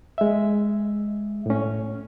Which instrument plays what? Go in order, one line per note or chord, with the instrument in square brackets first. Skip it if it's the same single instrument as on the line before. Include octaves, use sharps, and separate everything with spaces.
[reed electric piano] G#3 E5
A2 C#4